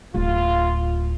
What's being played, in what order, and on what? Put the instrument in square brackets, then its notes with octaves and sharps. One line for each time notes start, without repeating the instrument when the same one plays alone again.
[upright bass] D1 [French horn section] F4